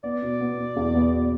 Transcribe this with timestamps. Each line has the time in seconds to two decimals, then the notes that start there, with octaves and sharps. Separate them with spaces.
0.04 B3 D5
0.22 B2
0.41 B3
0.58 B2
0.76 E2
0.95 B3
1.13 B2